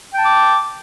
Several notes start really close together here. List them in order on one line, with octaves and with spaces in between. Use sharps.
G5 A5 D6